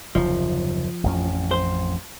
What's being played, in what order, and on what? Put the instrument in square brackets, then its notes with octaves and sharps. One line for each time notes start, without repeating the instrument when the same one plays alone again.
[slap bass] F#1 D#2 C3 [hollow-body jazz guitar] F3
[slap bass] A1 F2 C#4
[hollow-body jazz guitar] C5